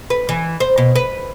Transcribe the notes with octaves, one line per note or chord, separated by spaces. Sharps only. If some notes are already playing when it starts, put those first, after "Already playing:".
B4
E3
C5
B2
B4